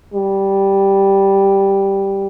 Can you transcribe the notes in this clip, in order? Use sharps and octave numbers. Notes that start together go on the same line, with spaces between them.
G3